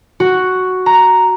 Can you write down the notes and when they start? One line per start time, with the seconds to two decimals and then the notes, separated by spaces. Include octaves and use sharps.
0.20 F#4
0.86 A#5